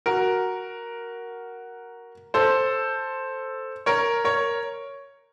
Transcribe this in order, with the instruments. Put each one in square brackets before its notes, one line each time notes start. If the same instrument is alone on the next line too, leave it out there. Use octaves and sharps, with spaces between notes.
[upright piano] F#4 A#4
A4 C5
A#4 C#5
A#4 C#5